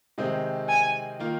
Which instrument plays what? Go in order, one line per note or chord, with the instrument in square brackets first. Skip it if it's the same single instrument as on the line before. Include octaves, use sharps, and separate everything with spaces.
[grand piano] C3 D#3 G#3 C4 G4
[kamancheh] G#5
[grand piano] D#3 A#3 F4